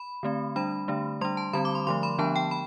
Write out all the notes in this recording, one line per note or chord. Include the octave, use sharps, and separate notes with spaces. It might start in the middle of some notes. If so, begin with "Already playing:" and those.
Already playing: B5
D3 A3 C4
G3 D4 B5
D3 A3 D4
G3 D4 C6
A5
D3 G3 C4 B5
D6
C6
D3 F3 A3 C6
B5
D3 F3 B3 D4 A5
G5
B5